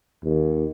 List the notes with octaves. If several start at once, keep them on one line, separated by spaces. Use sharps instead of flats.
D#2